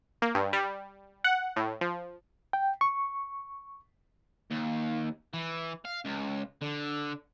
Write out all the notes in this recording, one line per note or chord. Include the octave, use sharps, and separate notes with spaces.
A#3
G2
G3
F#5
A2
F3
G5
C#6
D#2
E3
F5
C#2
D3